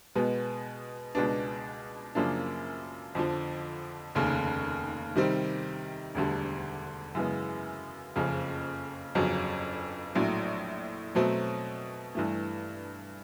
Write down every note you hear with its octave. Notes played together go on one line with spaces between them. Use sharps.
B2 G#3 B3
C#2 B2 G#3 B3 D4
F#2 C#3 F3 A#3 D4
F2 D3 F3
F1 D#2 C#3
C3 D#3 G3 C4
E1 D2 D3 G3
F#2 C#3 E3 G#3 B3
F#1 F2 C#3 F3
G1 F2 C#3 F#3
A#1 A2 F#3
B2 F#3 A3 C4
G2 E3 A3